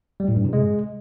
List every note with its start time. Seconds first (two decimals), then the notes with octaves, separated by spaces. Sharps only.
0.20 G3
0.28 A2
0.36 G2
0.45 C3
0.53 G#3